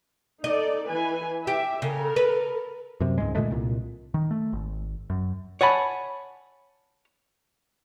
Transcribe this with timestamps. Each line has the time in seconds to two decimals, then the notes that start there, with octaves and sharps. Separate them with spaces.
0.44 D#4 A4 D5 D#5
0.88 E3 B4 G#5
1.47 G4 E5
1.82 C#3 A4 A#4
2.16 B4
3.00 F#2 C3
3.18 C#2 G#2 G#3
3.35 A#2 D3 G#3 A3
3.51 C2 A#2
4.14 D#3
4.31 A3
4.53 G#1
5.10 F#2
5.61 C#5 F#5 G#5 A5 B5